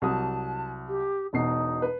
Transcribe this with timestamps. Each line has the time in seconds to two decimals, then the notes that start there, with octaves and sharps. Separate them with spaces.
0.02 C2 F#3 A5 D#6
0.88 G4
1.33 E1 B2 D#4 C7
1.82 B4